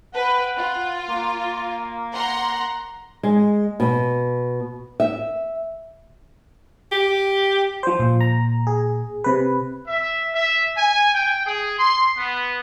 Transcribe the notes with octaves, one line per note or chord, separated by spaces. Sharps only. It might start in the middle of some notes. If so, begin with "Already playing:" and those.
B4 F#5 G5
F4
A#3
F#5 A#5 C6
G#3
B2
E5
G4
F3 C5
A#2
A#5
G#4
C3 B4
E5
E5
G#5
G5
G#4
C6
B3